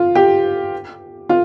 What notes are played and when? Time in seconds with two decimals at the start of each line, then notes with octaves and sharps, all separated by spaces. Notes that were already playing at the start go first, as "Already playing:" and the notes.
Already playing: F4
0.15 G4
1.29 F4